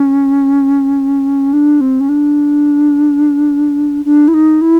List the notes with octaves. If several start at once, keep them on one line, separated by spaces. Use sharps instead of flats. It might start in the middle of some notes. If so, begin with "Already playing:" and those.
Already playing: C#4
D4
C4
C#4
D4
D4
E4
D#4
E4